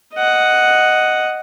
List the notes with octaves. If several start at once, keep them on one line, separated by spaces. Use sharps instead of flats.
D#5 F#5